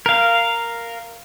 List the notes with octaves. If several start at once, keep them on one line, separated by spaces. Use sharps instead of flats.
A#4 F5